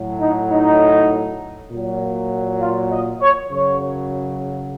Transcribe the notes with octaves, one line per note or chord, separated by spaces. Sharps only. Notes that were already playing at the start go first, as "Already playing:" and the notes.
Already playing: A2 F#3
D#4
D#4
A#2 F#3
F4
D#5
C#5
F#2 C#3 F#3 C#5